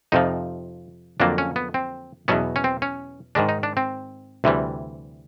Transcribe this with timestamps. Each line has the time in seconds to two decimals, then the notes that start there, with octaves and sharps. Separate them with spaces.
0.12 F2 C3 F3 D#4
1.20 F2 D3 F#3 A#3 D4
1.38 C#4
1.56 B3
1.74 C4
2.28 E2 B2 F#3 B3 C#4
2.56 C#4
2.64 C4
2.82 C#4
3.35 G#2 D#3 G#3 D4
3.49 D#4
3.63 D4
3.77 C4
4.44 D2 C3 E3 G3